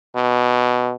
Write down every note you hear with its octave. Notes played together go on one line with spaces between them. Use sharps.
B2